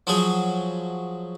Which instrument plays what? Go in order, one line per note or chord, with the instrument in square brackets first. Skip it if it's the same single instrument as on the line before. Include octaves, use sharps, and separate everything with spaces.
[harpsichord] F3 F#3 G#4